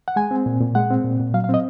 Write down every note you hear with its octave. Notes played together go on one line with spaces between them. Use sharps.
F#5
G#3 G#5
C4
A#2
A#2
G#3 F#5
C4
A#2
A#2
F#3 F5
F5
C4 D#5